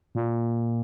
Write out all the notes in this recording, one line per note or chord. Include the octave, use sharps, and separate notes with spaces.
A#2